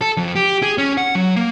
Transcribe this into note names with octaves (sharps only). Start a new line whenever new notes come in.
A4
F2
G4
G#4
C#4
F#5
F#3
A#3